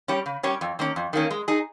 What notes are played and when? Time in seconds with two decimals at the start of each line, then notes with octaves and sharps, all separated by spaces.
0.08 G3 C#4 G4 C#5
0.26 C#3
0.43 G3 C#4 G4 C#5
0.61 F2
0.79 D#3 A#3 C#4
0.96 F2
1.13 D#3 A#3 C#4
1.31 G#3
1.48 D#4 G#4